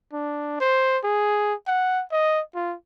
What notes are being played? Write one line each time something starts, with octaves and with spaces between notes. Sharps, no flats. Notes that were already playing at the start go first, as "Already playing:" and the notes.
D4
C5
G#4
F#5
D#5
F4